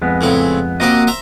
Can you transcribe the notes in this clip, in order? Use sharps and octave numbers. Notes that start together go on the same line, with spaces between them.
F2 G#3 B3
A2 C#3 C4
F3 A#3 C4 F#4 G4 D#5
C5 E5 A#5